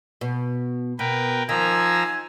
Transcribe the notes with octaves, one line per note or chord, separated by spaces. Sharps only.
B2
B2 A#4 B4 G5
D#3 F3 G#5 A#5 E6